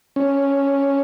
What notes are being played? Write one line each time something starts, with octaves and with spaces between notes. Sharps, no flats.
C#4